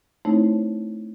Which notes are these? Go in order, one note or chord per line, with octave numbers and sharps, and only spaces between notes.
A3 C4 D#4 E4 C5 C#5